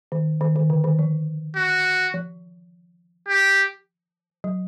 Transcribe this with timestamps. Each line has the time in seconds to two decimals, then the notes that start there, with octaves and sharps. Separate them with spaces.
0.12 D#3
0.41 D#3
0.56 D#3
0.70 D3
0.84 D#3
0.99 F3
1.56 F#4
2.14 F3
3.29 G4
4.44 F#3